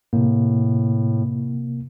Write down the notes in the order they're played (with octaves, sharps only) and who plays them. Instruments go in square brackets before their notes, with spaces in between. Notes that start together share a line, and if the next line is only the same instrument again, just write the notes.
[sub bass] A2 [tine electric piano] C3 A#3